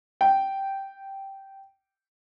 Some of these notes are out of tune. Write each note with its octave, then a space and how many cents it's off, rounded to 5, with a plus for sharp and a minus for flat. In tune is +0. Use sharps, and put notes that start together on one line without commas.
G5 -10